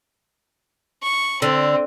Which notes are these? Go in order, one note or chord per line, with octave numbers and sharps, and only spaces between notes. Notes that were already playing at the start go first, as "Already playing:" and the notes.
C#6
D3 C4